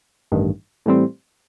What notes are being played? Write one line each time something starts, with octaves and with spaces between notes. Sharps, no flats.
A1 G2 D#3
A2 E3 G3 C4